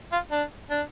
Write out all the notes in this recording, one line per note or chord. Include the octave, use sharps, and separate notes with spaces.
F4
D4
D4